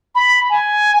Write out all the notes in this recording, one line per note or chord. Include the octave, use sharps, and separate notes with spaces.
B5
G#5